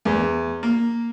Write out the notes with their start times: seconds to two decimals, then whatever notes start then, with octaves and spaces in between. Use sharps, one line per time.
0.05 E2
0.63 A#3